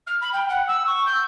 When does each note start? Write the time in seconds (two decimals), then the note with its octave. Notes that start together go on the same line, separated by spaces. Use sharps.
0.07 F6
0.21 B5
0.33 G5
0.49 F#5
0.67 E6
0.86 C#6
1.06 G6